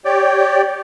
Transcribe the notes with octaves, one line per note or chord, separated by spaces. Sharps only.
G4 C#5 D5 G5